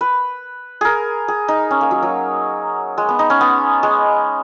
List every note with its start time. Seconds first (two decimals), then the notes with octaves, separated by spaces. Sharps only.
0.01 B4
0.81 G#4 A#4
1.28 G#4
1.48 D#4
1.71 C#4
1.81 A#3
1.91 F#3
2.02 F#3
2.98 G#3
3.09 B3
3.19 D#4
3.30 C#4
3.41 B3
3.83 G#3